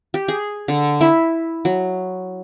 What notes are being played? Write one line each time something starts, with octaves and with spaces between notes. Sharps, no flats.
G4
G#4
D3
E4
F#3